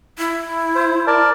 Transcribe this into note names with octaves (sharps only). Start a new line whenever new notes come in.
E4
C5
A#4 D5 A5